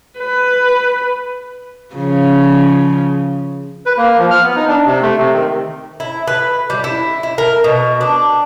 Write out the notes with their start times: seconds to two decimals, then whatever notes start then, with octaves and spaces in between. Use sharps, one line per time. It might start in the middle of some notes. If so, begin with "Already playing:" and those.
0.19 B4
1.95 C#3 F3
3.86 B4
3.97 A#3
4.18 F3
4.31 F6
4.43 B3
4.56 D#4
4.68 D4
4.86 C3
5.02 A3
5.18 C3
5.33 D#3
6.00 E4
6.28 B4
6.70 G3
6.84 E4
7.23 E4
7.38 A#4
7.64 B2
8.01 D4